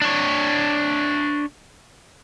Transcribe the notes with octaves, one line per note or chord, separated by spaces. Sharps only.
D4 C#5